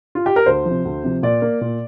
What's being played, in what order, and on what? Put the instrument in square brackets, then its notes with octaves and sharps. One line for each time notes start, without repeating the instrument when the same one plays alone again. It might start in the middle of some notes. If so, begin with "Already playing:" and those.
[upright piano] F4
G4
A#4
D2 C5
C3 F3
D2
C3 F3
A#2 D5
A#3
A#2